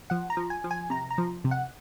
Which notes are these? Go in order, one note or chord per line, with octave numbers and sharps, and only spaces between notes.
F3 F#5
A#5
F3
G#5
F3
G#5
C3 A#5
A#5
F3
C3
F#5